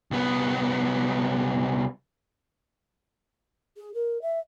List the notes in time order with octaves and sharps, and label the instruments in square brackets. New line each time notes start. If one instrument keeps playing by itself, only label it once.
[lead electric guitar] C2 B3
[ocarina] G#4
A#4
E5